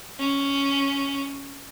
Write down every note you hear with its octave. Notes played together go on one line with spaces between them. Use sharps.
C#4